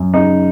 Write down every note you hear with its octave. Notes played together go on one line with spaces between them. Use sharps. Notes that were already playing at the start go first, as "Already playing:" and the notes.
Already playing: F#2
C#3 D#4